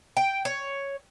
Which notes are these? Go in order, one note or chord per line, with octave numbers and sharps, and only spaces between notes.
G5
C#5